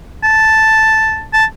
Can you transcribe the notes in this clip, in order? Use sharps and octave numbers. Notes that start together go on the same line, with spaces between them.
A5
A5